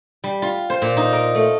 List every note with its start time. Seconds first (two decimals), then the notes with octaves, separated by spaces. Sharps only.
0.24 G3
0.42 F4
0.70 C5
0.82 A#2
0.97 D#4
1.13 A#4
1.35 A3